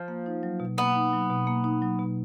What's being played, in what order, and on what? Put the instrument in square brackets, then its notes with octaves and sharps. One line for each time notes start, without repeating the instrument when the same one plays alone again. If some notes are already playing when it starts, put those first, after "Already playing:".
Already playing: [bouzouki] F3
[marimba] A#3
D#4
F#3
B2
[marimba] A#3 [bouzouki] B3
[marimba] D#4
F#3
B2
A#3
D#4
F#3
B2